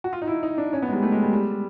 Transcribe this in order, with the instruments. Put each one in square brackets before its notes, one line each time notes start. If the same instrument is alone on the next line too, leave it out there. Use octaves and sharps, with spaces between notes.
[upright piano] F#4
F4
D#4
E4
D#4
D4
C#4
B3
G#3
G3
A3
G#3
G3
G3